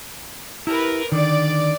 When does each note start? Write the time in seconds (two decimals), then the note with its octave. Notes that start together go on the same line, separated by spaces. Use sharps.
0.67 E4 G4 A#4 B4
1.12 D3 D#3 D5